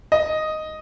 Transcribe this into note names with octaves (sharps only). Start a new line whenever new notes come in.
D#5